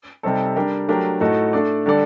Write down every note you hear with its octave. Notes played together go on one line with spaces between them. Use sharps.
C3 G3 C4 D#4 A4
G3 D4 G4 A#4
F#3 A3 D4 G4 A#4
A2 A3 D#4 F#4 A4
A3 D4 A4 D5
D3 G3 D4 A4 D5